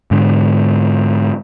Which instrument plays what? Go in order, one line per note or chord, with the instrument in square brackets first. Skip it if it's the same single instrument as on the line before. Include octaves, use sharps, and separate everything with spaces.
[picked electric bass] G#2 D3